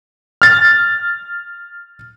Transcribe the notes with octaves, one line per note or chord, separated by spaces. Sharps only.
F6 A6